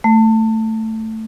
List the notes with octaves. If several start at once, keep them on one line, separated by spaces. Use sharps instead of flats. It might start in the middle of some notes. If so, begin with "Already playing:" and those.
A3